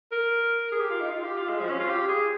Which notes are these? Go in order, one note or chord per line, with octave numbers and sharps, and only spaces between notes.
A#4
G#4
G4
F4
D#4
F4
G4
F4
G#3
F3
C#4
F4
G4
G#4